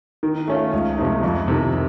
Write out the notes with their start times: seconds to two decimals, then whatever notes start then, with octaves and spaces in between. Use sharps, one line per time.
0.23 D#3
0.48 A3 C#4 F4
0.73 C#2
0.98 C3 F3 A3 D#4
1.23 F2
1.48 C3 D#3